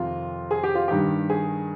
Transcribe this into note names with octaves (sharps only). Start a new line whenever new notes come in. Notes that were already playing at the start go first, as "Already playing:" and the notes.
Already playing: F2 C3 D#3 F4
G#4
G4
F4
G2 D#3 G4
G#4